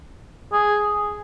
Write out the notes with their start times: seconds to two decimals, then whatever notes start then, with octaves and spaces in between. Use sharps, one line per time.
0.52 G#4